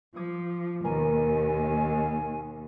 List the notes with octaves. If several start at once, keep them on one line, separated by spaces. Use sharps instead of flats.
F3 D6 D#6 G#6
D#2 B2 A#4 G#5